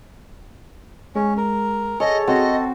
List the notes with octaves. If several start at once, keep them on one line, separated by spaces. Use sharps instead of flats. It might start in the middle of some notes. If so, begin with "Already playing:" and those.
G#3 C#4
A#4
G#4 A4 C#5 D#5
C4 F#4 D#5